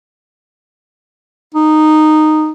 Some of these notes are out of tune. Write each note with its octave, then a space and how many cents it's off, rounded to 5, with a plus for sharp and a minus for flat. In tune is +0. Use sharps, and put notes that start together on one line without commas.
D#4 -10